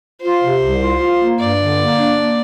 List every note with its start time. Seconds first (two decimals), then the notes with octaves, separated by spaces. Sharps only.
0.21 F4 C5
0.41 C3
0.61 C2
0.80 F4
1.00 F4
1.19 A#3
1.38 G2 D5
1.58 D3
1.77 A#3
1.97 D4
2.17 A#3